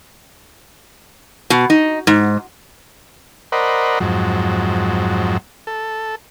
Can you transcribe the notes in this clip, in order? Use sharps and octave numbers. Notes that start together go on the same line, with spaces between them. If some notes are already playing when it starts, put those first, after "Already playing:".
B2
D#4
G#2
A#4 C5 D5 D#5 F#5 B5
F2 G#2 F#3
A4